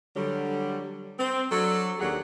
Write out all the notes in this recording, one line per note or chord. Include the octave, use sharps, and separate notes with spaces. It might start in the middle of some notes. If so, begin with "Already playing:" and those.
D3 F#3 G3
C4
F#3 D4 A4
D#2 F#3 D4 G4 G#4 F#5